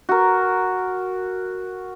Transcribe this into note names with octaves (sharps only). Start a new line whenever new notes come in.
F#4 A#4